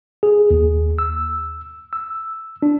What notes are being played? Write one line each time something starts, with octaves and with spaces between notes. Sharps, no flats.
G#4
D#2
E6
E6
D4